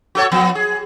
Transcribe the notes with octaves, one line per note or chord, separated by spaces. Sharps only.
F#4 A4 C#5
F3 B3
G#4